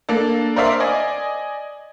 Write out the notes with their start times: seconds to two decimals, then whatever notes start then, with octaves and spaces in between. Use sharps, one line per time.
0.09 A#3 D4 A4
0.56 A#4 C5 D5 E5 F5
0.80 D5 D#5 G#5